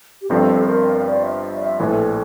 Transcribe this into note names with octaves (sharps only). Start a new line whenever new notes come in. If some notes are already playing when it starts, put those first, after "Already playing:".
G4
G1 G2 F3 C4 A4
A#4
D5
E5
E5
D5
E5
A#1 A2 E3 A4